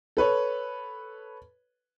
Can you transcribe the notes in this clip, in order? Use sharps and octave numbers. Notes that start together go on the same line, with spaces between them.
A4 B4 C#5